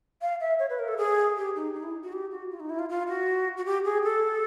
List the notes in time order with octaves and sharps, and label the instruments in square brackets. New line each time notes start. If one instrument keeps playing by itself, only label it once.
[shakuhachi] F5
E5
C#5
B4
A#4
A4
G#4
G4
D#4
D#4
E4
F#4
G4
F#4
F4
D#4
E4
F4
F4
F#4
F#4
G4
G#4
A4